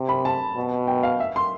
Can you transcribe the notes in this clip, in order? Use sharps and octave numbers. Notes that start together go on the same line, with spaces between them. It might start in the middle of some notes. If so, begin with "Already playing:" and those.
Already playing: C3
B5
A5
B2
G5
F5
E5
C6